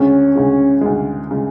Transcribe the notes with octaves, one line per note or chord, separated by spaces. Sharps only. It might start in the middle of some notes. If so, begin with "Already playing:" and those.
Already playing: D2 C#3 G#3 C#4
D2 C#3 G#3
D2 C#3 G#3
C#3 G#3